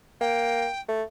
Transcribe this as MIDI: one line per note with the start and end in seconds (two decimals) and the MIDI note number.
0.21 0.67 58
0.21 0.80 79
0.88 1.03 57